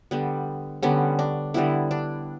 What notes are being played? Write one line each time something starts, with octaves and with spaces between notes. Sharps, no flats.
D3 G3 B3
D3 G3 B3 C#4
D4
D3 G3 B3 E4
D4